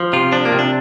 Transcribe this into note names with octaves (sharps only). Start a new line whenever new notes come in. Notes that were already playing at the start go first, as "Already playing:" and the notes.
Already playing: F3
C3 F4
F3 D4
A#3
C3
D4